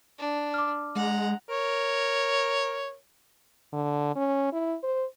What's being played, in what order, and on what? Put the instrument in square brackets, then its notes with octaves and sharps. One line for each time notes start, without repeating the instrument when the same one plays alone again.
[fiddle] D4
[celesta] D6 F6
[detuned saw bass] G#3 [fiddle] F#5 A#5
[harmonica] A#4 C#5
[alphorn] D3
C#4
E4
C5